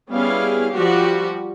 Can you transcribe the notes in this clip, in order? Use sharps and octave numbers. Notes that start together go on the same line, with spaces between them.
G3 B3 C#4 E4 G#4 F5
F3 G3 F#4 G4